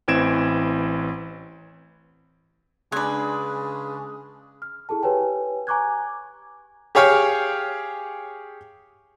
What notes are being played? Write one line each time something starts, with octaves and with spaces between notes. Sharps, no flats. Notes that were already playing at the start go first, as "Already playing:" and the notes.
A1 E3 C4 G#6 D7 E7
C#3 G#3 D4 B4 G#5
F6
E4 G#4 A4 A5
G4 B4 C#5 G5 G#5
G#5 A#5 C#6 D6 F#6 G#6
G4 G#4 C#5 F5 G5